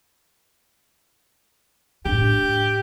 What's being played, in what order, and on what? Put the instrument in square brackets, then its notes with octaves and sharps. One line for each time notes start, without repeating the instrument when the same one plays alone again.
[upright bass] A2 D4 [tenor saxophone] G4